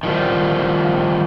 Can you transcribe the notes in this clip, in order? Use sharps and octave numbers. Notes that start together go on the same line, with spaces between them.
D#3 F3 G3